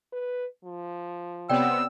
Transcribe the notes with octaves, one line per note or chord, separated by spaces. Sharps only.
B4
F3
C3 B3 C4 C#5 D5 G5 E6